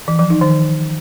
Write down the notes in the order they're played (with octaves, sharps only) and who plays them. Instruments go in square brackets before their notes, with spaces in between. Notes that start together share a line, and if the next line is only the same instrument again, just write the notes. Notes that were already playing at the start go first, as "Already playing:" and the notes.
[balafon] E3
F3
D#4
D#3